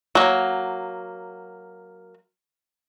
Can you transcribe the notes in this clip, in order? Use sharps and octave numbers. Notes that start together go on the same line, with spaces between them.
F#3 A#3